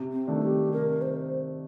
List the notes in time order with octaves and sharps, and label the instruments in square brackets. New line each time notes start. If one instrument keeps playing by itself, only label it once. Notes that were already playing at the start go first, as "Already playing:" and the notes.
Already playing: [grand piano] C3
[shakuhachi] C4
[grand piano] D#3 A3 D4
[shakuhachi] G4
[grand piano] C3 [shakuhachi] A#4
[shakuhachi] C5